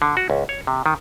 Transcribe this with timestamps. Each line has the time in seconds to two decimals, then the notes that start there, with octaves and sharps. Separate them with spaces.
0.02 D3
0.17 F#4
0.30 C#2
0.49 C#5
0.67 C3
0.86 D#3